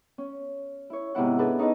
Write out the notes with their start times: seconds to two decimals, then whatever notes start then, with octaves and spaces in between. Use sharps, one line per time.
0.18 C#4
0.90 E4 C#5
1.15 G#2 C3 B3 E4 F#5
1.39 D4 G#4 A4 B4
1.58 C#4 D#4 E4 G#4 B4 D#5